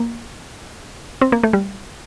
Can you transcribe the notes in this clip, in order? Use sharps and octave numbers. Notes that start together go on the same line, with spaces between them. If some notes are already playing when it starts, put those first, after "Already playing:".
Already playing: A#3
C4
A#3
A3
G3